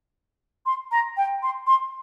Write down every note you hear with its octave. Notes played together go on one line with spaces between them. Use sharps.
C6
A#5
G5
C6
C6